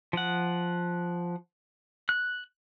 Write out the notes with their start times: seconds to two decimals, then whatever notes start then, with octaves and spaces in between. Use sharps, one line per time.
0.13 F3 F#5
2.09 F#6